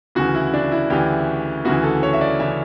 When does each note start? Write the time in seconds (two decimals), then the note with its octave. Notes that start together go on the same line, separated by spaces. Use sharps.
0.15 D2 C#3 E3 F#4
0.34 E4
0.54 D4
0.72 E4
0.90 D2 C#3 E3 G4
1.65 D2 C#3 E3 F#4
1.84 A4
2.03 C#5
2.13 E5
2.21 D5
2.40 C#3 E3 E5